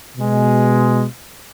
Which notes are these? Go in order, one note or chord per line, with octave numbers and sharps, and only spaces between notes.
B2 G#3